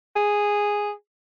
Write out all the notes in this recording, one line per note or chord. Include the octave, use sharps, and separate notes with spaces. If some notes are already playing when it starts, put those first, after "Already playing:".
G#4